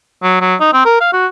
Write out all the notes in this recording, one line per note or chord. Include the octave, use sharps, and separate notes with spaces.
F#3
F#3
D#4
C4
A#4
F5
F#4